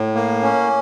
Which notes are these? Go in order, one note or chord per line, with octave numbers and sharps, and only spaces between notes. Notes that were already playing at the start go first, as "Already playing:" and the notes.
Already playing: A2
A#3
C#4